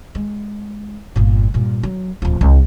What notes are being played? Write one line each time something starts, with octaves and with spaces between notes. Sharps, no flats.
G#3
G1 A#2
G2 A#2
F#3
D1 F3
C2